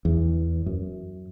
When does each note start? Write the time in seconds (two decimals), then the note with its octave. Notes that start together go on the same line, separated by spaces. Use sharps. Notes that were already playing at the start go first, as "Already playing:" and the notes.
0.05 E2
0.66 F#2